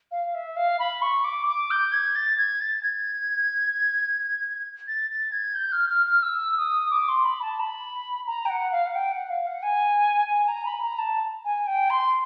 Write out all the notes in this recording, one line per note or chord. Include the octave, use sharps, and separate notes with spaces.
F5
E5
F5
B5
C#6
D6
D6
G6
G#6
A6
G#6
A6
G#6
A6
A6
G#6
G6
F6
F6
F6
E6
D#6
D6
C6
B5
A5
B5
A#5
G5
F#5
F5
F#5
G5
F#5
F5
F#5
G#5
G#5
A#5
B5
A#5
A5
G#5
G5
C6